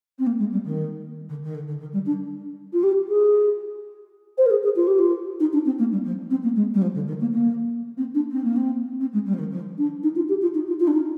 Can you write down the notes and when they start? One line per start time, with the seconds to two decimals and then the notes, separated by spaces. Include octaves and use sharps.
0.19 C4
0.26 A#3
0.39 G#3
0.52 G3
0.65 D#3
1.29 D3
1.43 D#3
1.55 D3
1.67 D3
1.80 D#3
1.93 G3
2.06 D4
2.73 F4
2.83 G4
3.09 G#4
4.38 C5
4.46 A#4
4.50 G#4
4.63 G#4
4.76 F4
4.87 G4
4.99 F4
5.40 D#4
5.53 D4
5.66 C4
5.79 A#3
5.92 G3
6.05 F3
6.30 C4
6.43 A#3
6.56 G#3
6.74 G3
6.82 F3
6.95 D3
7.07 D#3
7.20 A#3
7.33 A#3
7.97 C4
8.14 D4
8.31 C4
8.44 A#3
8.56 C4
9.00 C4
9.13 G#3
9.26 G3
9.34 F3
9.39 D#3
9.51 F3
9.78 D4
10.03 D#4
10.16 F4
10.29 G4
10.42 F4
10.55 D#4
10.68 F4
10.80 F4
10.87 D4
10.93 D#4